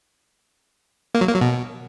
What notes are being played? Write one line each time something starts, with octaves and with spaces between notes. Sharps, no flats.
A#3
F#3
A#3
F#3
B2